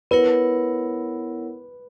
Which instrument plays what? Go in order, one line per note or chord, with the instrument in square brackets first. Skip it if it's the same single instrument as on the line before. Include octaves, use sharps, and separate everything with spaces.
[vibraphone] B3 E4 A#4 C#5 F#5 [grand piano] B4